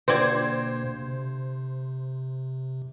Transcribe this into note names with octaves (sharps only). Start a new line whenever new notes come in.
B2 D3 A#3 C4 C5 D5 G#6
C3